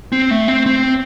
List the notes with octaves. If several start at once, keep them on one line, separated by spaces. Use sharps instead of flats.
C4
A3
C4
C4